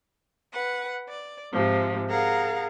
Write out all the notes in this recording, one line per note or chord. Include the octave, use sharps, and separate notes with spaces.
B4 F#5
D5
G#2 C3 F3
G#4 A#4 F5 F#5 A#5